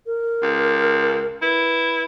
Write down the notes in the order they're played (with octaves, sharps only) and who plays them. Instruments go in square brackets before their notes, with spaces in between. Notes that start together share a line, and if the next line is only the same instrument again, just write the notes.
[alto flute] A#4
[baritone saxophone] C#2
[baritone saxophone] E4 [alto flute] B4